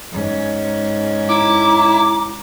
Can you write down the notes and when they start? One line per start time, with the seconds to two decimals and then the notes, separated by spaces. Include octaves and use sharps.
0.12 G#2 C#4
1.29 E4 A#5 D6